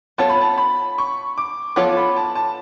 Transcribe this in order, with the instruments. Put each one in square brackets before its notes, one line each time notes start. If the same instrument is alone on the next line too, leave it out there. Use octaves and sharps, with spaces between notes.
[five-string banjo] B3 F4 A4 C#5 [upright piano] A5
[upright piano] B5
A5
B5
C#6
D6
[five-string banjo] F3 B3 F4 A4 C#5 [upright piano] D6
[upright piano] B5
A5
A5